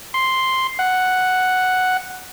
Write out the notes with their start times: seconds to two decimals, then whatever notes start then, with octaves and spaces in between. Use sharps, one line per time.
0.14 C6
0.79 F#5